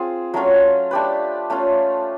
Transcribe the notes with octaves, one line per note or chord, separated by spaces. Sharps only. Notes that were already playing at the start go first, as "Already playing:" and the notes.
Already playing: C4 F4 G#4
F#3 A3 C#4 F4
A3 D4 G4 B4
A3 C#4 F4